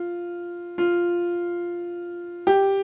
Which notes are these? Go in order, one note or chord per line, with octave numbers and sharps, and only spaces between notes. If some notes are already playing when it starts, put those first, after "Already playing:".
Already playing: F4
F4
G4